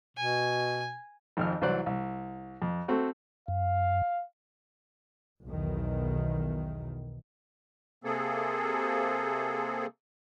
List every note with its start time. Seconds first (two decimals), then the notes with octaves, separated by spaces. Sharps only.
0.17 B2 G#5
1.37 G#1 F2 F6
1.62 C2 E3 F#3 C5 D5 F#6
1.86 C2
2.62 F2
2.88 A3 C4 F#4
3.48 F#2 F5
5.46 B1 E2 D#3
8.04 C3 A#3 C4 G#4 A4